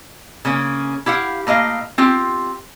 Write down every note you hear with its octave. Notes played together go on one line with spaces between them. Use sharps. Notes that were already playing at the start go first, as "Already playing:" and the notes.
C#3 A#3 C#4
E4 G4 F5 F#5
A2 A#3 D#5 F5
C4 F4 G4 G5